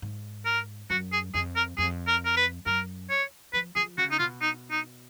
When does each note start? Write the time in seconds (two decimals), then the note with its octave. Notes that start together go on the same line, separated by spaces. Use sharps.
0.02 G#2
0.46 A#4
0.90 F#2 F#4
1.13 G#4
1.34 F2 G#4
1.56 A#4
1.78 F2 G#4
2.07 A#4
2.25 A#4
2.37 B4
2.66 F#2 A#4
3.10 C#5
3.53 F3 B4
3.75 F3 G#4
3.98 C#3 F#4
4.11 D#4
4.19 B2 F4
4.41 D#4
4.71 D#4